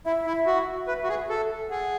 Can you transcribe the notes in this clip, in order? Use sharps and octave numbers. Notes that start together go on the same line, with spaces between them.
E4 E5
E4
F#4
B4 E5
F#4
G#4
A4
G#4 F#5